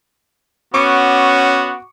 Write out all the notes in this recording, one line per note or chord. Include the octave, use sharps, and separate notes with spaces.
B3 C#4 F#4 C#6 D6 C#7